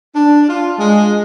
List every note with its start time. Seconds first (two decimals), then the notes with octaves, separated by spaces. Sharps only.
0.16 D4
0.49 F4
0.79 G#3